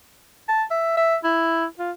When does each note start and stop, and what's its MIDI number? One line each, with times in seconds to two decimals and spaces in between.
0.48 0.63 81
0.71 0.93 76
0.97 1.16 76
1.24 1.65 64
1.79 1.92 65